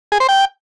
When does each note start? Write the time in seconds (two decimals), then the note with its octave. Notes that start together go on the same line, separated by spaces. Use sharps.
0.12 G#4
0.20 C5
0.29 G5